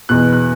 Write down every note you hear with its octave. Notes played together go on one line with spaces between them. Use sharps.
E2 B2 F#6
F#6